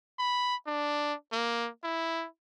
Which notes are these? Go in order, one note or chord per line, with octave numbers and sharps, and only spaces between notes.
B5
D4
A#3
E4